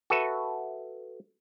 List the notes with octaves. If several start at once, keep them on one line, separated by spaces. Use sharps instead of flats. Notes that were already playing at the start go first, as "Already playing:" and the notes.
F#4 A4 B4 E5